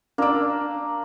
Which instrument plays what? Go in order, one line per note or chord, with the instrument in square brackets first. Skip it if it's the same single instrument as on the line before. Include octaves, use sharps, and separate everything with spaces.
[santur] A#3 E6 [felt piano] D4 D5